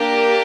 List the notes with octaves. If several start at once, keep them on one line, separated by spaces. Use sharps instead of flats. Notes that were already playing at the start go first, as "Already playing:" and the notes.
Already playing: A#3 D4 G4